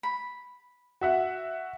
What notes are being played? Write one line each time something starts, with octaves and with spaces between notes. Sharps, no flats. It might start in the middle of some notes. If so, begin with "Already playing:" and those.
B5
F#4 E5 F#5